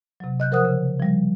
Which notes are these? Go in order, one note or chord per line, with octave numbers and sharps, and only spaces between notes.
C3 F#3
D#5 F#6 G6
F3 A#4 C5 F#5 D#6 F#6
C#3
F3 G3